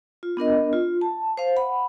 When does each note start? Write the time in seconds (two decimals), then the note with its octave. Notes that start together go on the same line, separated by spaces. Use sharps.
0.23 F4
0.37 B3 D4 A#4 D#5
0.73 F4
1.01 A5
1.37 C5 F5
1.56 F#5 B5